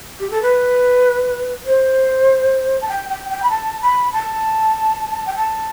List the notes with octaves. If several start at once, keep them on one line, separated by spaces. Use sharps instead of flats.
G4
A4
B4
C5
A5
G5
G5
G5
B5
A5
B5
A5
G5
A5